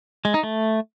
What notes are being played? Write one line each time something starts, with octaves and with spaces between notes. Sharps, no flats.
G#3
D#4
A3